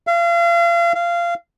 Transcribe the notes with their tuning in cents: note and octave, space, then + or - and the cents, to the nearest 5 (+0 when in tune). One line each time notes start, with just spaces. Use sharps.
F5 -35
F5 -20